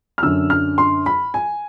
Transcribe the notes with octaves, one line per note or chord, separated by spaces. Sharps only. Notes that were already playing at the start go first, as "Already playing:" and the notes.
F6
F#2 D3 E6
F6
C6
B5
G#5